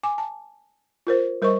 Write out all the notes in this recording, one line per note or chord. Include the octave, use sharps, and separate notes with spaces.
G#5 D6
A5
F4 A#4 C5
G3 A#4 C5 D#5 C#6